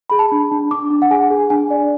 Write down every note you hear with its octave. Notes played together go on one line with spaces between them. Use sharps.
G#4 B5
A5
D4
D4
D4 D6
D4
F#5
G#4 G#5
G#4
D4 G#5
D5